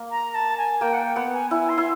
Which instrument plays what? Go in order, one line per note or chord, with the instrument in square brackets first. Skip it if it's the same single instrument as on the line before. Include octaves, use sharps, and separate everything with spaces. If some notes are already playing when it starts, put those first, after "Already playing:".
Already playing: [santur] A#3
[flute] A#5
A5
G#5
[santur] A#3 [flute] G5
[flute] F#5
G5
[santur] B3 [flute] F#5
[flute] G#5
[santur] E4 [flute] G#5
[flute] C6
[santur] E4